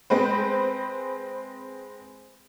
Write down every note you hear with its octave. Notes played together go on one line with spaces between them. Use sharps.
G#3 C4 B4 C5